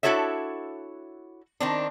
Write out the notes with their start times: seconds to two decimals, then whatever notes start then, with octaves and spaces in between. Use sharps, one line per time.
0.03 D4 E4 F#4 A4 C#5 E5
1.60 D#3 C4 D4